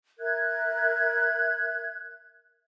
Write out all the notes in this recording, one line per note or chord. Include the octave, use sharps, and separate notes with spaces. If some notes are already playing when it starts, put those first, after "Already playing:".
A#4 E5 F#6 G#6